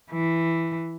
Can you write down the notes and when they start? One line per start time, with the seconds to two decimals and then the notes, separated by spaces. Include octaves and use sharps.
0.12 E3